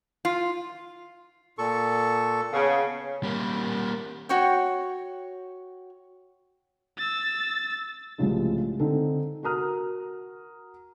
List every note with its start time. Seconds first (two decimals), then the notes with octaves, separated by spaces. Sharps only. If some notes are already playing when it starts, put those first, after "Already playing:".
0.25 F4
1.58 A#2 A4 C#6
2.53 C#3 B3
3.23 G3 A#3
4.29 F#4 C#5 G5
6.98 E6 A6
8.18 C2 A2 C#3 F3 G#3
8.79 D3 C4 D#4 A4
9.43 F#4 A#4 A#5 D#6 F6